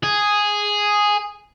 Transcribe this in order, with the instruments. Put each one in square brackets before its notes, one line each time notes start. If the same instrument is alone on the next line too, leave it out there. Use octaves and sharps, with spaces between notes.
[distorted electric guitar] G#4